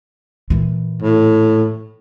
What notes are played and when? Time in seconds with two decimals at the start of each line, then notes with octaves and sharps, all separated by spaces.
0.50 A#2 E3
1.02 A2